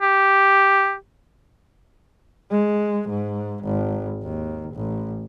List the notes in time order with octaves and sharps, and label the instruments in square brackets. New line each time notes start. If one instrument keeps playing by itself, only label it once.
[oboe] G4
[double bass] G#3
G#2
G#1
D#2
A1